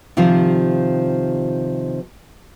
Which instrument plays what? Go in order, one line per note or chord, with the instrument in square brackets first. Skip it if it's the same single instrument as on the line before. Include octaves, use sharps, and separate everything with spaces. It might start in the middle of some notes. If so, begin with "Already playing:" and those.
[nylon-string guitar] C3 D#3 F3 G3 F4 C5